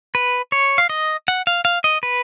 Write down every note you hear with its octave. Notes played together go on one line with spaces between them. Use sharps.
B4
C#5
F5
D#5
F#5
F5
F5
D#5
B4